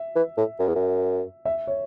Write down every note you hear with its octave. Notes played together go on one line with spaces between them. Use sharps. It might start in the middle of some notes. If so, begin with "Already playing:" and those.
Already playing: E5
E3
A2
F#2
E2
F#2
E5
C#5